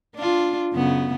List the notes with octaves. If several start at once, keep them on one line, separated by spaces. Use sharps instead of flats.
D4 F4
F#2 C#3 B3